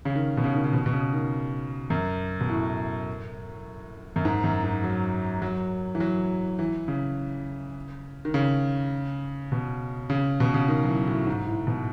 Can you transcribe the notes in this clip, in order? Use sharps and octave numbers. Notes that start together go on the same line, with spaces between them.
C#3
D#3
B2
C#3
D#3
C#3
B2
B2
C#3
D#3
F#2
B2
A2
F#2
G#2
F#2
G#2
F#3
F#3
E3
F#3
E3
C#3
D#3
C#3
B2
C#3
B2
C#3
D#3
F#3
E3
A2
G#2
A2
B2